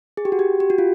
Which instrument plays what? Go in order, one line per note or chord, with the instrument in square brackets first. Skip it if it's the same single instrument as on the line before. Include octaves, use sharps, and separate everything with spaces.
[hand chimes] G#4
G4
F#4
G4
G4
F#4
F4